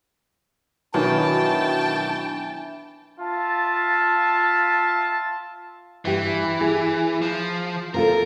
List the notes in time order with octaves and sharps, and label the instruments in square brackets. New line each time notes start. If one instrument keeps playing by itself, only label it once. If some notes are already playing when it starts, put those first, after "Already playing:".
[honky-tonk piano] B2 D#3 F#3 [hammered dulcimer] E3 [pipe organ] D4 [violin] G5 A5
[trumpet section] F4 E5 A5
[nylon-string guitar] G2 G4 [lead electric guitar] E3
[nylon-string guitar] G#4
[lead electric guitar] F3
[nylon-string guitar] C3 F4 A4 [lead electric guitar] A#4